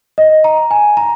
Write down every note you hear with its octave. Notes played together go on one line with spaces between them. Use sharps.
D#5
A#5
G#5
A#5